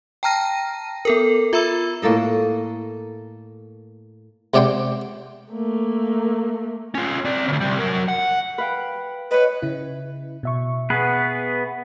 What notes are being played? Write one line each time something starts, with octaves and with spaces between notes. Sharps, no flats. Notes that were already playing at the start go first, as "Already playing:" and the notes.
G5 A5 A#5 F6 A#6 D#7
B3 A4 A#4
F4 E5 A#5 B5 E6
A2 A#3 A4 D#5
C#2 C3 D5 F#5 G5 C6
A3 A#3
C#4 F4
C4 D5
D2 C#3
C3 G3
F#3 A#4
F#5
B4 F5 G5
B4 C#5 D#5
C#3 E4
B2 E5 C#6
B3 G#4 B4